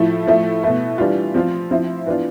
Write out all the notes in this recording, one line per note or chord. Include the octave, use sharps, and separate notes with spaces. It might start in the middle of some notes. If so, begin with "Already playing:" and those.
Already playing: A2 F3 A3 E4
A2 F3 A3 E4
B2 A3 E4
E3 G3 D4 F4
F3 C4 F4
F3 C4 E4
E3 B3 D4 F4